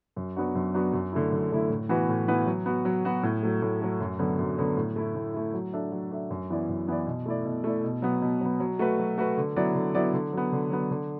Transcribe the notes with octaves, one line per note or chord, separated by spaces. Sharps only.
F#2
F#3 B3 D4 F#4
F#2
F#3 B3 D4 F#4
F#2
D3 A3 E4
F#2
D3 A3 E4
A2
E3 B3 F#4 B4
A2
E3 B3 F#4 B4
F#3
B3 F#4
F#3
B3 F#4
A2
F#3 A3
A2
F#3 A3
F#2
D3 F#3 B3
F#2
D3 F#3 B3
A2
A3 E4
A2
A3 E4
F#3
D4 A4 E5
F#3
D4 A4 E5
F#2
E3 B3 E4 D5
F#2
E3 B3 E4 D5
B2
A3 E4 D5
B2
A3 E4 D5
B2
F#3 B3
B2
F#3 B3
F#3
A3 F#4 B4
F#3
A3 F#4 B4
D3
F#3 B3 E4 D5
D3
F#3 B3 E4 D5
D3
F#3 B3
D3
F#3 B3
D3